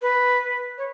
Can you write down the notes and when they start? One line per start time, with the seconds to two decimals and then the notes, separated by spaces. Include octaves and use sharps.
0.01 B4
0.77 C#5